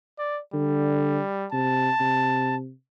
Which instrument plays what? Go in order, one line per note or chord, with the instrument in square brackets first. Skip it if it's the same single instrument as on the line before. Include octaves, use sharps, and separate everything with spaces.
[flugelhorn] D5
[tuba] D3 [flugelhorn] G3
[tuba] C3 [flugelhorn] A5
[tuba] C3